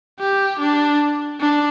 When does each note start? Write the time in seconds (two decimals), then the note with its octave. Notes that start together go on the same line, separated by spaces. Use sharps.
0.20 G4
0.60 D4
1.41 D4